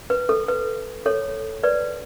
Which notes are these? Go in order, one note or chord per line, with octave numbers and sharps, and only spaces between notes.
B4
A4
B4
A4 C#5
B4 D5